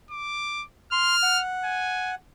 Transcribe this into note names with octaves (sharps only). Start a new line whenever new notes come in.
D6
C6 F6
F#5
G#5